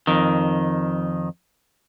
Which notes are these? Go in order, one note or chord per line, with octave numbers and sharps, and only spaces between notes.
F2 D#3